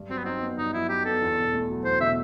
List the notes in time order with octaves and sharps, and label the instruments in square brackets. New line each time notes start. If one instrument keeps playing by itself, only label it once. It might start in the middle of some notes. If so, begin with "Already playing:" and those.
Already playing: [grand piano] G2
[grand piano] F#3 [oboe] C4
[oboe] B3
[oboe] C4 [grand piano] D#4
[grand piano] B3
[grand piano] G2 [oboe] D#4
[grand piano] F#3 [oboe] E4
[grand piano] D#4 [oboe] G4
[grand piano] B3 [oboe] A4
[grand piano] E2
B2
A3
F#3
[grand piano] E2 [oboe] C5
[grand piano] B2 [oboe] E5